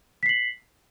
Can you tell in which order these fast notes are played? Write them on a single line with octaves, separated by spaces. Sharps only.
B6 C7 F#7